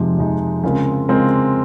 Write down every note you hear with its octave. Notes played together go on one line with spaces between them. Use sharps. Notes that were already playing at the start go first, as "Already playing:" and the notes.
Already playing: F2 C3 F3 G#3 D#4
F2 C3 F3 G#3 D#4
C#3 G#3 C4 F4 A#4
C#3 G#3 C4 F4 A#4